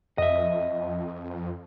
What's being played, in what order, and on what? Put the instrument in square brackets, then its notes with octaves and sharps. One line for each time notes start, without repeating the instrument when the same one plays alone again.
[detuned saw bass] F2 [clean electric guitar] D#5 E5